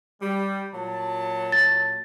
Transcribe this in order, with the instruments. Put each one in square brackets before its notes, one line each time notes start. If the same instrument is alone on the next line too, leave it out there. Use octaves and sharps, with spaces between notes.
[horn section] G3
A#2 F#3 A5
[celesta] A6